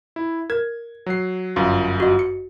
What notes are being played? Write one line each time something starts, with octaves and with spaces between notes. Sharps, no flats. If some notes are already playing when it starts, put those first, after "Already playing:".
E4
A#4 G#6
F#3 C7
G1 F#2 F4
F#4 D#5
C#7